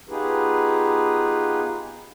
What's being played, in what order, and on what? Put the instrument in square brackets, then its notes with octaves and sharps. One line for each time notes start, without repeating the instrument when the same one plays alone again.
[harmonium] B3 D#4 F4 G4 G#4 B4